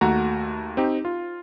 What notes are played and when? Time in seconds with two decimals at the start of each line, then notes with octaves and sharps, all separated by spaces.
0.01 D#2 A3 F#4 A#5
0.77 C4 D#4 G4
1.05 F4